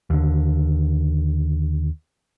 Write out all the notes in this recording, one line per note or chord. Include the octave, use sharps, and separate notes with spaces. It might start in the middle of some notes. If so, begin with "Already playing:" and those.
D#2 D3